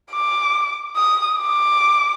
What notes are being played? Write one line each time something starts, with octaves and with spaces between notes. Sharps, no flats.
D6
D#6
D6